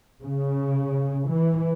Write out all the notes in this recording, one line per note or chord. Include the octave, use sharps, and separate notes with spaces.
C#3
E3